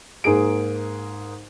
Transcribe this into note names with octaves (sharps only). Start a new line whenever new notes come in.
G#2 A#3 G#4 D7